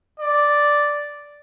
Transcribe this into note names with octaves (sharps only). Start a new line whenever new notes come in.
D5